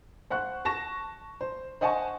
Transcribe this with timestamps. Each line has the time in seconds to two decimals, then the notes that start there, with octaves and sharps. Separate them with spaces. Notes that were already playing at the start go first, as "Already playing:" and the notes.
0.30 C5 F#5 C#6 F#6
0.65 A5 C#6 A#6 E7
1.41 C5
1.81 C5 D#5 F#5 G#5 A5 C#6